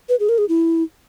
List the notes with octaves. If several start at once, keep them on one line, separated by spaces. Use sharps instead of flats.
B4
G#4
A#4
G#4
E4